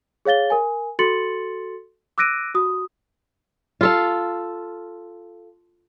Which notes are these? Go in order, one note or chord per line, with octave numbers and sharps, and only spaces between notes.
G#4 C#5 F5 A6 G7
A#4 G#5
F#4 A4 C6 A6 C#7 F#7
D6 E6 F#6 A#6 D7 D#7
F#4 D#6
F4 A4 F5